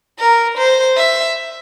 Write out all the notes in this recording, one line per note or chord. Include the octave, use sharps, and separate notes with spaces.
A#4
C5
E5